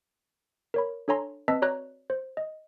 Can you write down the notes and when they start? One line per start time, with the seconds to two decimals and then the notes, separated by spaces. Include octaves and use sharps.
0.74 A#4 C#5 B5
1.08 D4 A4 C#5 G#5 A#5 C6
1.48 C4 B4 D#5 A5 E6 B6
1.62 F#4 C#5 D5 A#5 F#6
2.10 C5
2.37 D#5